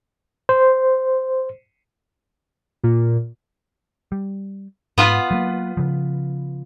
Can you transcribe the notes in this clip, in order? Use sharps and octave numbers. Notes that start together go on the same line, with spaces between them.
C5
A#2
G3
G#2 B3 F4 B4
F#3 G#3 A#3
C#3 F3